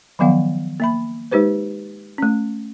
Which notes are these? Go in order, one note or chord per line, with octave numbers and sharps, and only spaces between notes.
D#3 F3 F#3 B3 F5 F#5
A#3 E5 B5
G#3 D#4 G4 B4 C5
A3 C#4